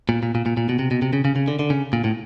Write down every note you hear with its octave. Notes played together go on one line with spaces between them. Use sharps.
A#2
A#2
A#2
A#2
A#2
B2
C3
B2
C3
C#3
C#3
C#3
D3
D3
C#3
A#2
A2